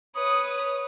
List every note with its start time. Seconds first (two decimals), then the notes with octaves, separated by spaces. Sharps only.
0.15 B4 C#5 D#6